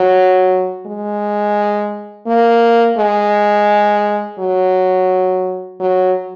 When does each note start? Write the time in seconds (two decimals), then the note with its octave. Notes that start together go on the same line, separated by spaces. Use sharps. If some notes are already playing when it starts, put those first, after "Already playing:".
Already playing: F#3
0.86 G#3
2.27 A#3
2.98 G#3
4.39 F#3
5.80 F#3